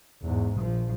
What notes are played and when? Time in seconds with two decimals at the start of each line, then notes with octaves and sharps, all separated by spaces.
0.22 E2 G#2
0.57 A#1 F3